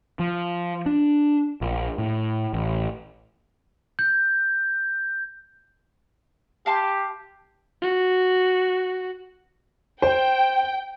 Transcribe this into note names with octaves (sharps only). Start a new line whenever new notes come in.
F3
D4
A#1
A2
A1
G6
G4 F5 A5 C6
F#4
C5 G5